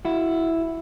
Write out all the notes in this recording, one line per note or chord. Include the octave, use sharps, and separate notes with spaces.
E4 F#4